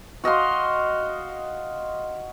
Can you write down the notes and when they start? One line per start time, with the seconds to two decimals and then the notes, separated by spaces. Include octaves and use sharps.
0.24 F#4 D#5 F5 C6